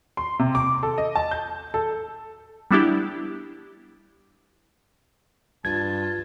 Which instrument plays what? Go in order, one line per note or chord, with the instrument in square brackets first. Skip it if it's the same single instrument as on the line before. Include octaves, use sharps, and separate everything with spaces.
[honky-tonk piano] C6
C3
D6
A4
D#5
A5
G6
A4
[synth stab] G3 B3 D4 E4 G4
[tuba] G2 [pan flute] F4 [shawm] A5 [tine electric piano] G#6